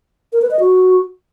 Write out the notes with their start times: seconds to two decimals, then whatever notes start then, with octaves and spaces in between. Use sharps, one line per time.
0.33 A#4
0.42 B4
0.51 D#5
0.60 F#4